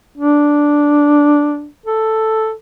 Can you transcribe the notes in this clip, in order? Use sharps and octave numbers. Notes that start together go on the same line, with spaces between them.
D4
A4